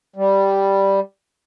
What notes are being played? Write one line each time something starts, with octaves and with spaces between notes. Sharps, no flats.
G3